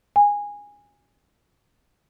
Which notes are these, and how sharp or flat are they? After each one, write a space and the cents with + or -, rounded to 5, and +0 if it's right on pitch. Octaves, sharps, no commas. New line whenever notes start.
G#5 -15